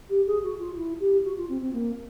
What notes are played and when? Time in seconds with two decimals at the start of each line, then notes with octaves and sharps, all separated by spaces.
0.09 G4
0.26 G#4
0.43 F#4
0.59 F4
0.76 E4
1.00 G4
1.24 F#4
1.36 F4
1.49 C4
1.61 C4
1.73 A#3